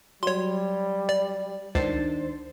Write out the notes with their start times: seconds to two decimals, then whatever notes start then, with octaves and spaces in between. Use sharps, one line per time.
0.23 F#3 G3 C#5 C6
1.09 D5
1.75 C#2 D#3 D4 C5 A6